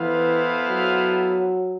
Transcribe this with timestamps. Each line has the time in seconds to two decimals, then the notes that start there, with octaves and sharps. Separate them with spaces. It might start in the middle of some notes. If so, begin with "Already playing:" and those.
Already playing: E3 B3 E4 A4 C5 F5
0.69 F#3